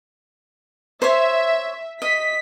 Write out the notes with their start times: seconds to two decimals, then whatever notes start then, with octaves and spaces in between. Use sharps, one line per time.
1.02 C5 C#5 E5
2.02 D#5 B6